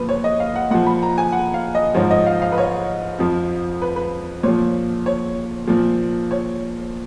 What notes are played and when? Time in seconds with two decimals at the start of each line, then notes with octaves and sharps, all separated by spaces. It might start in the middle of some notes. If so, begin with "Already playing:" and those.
Already playing: A#2 F3 B4
0.09 C#5
0.24 D#5
0.40 F5
0.56 F#5
0.70 A#2 F3 F#5
0.86 B5
1.03 A#5
1.18 G#5
1.32 F#5
1.54 F5
1.75 D#5
1.95 G#2 F3 C#5
2.11 D#5
2.26 F5
2.42 F5
2.52 B4
2.58 C#5
3.19 F2 F3
3.82 B4
3.96 B4
4.43 A#2 F3 C#5
5.06 C#5
5.67 A#2 F3
6.31 C#5